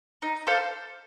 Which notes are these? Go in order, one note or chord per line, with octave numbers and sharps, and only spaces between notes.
D#4
A4 C5 F5